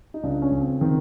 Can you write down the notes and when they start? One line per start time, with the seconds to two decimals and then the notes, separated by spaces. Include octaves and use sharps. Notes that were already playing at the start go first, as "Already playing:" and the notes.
0.14 D#4
0.23 C#2 D4
0.42 C#4
0.51 C#2
0.61 C4
0.81 D#3 C4